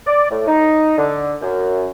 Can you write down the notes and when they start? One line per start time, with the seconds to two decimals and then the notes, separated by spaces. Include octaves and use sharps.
0.07 D5
0.31 A2
0.47 D#4
0.98 D3
1.42 F#2